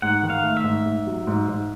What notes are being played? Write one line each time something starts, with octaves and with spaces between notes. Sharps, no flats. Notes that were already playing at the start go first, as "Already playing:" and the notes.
G#2 F#5
D#3
F5
A3
E5
G#2
G#2
F#3
G#2
G#2